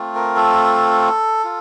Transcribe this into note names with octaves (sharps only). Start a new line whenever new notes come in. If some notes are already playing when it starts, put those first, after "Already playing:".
Already playing: A3 C4 F4
A#4
A4
F4